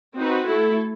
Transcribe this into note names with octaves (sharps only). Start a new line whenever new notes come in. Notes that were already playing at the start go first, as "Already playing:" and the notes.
C4 D#4 F#4 B4
A3 E4 A4